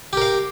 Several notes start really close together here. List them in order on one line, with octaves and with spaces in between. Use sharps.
G4 A#4 F5